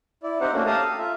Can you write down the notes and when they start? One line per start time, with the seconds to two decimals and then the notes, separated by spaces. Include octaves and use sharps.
0.23 E4 D5
0.41 C4 D#4 G4 C5 F#5
0.53 A3 A#3 C#4 D4 F#4
0.66 G4 F5 A5 A#5 D#6
0.84 A4
0.98 F4 E5